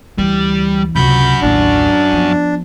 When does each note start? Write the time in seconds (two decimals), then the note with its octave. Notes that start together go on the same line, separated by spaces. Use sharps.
0.18 D2 E3 G3
0.96 C#2 F#2 C3 F#4 B5 G6
1.42 A1 D#2 D4
2.13 F3 B3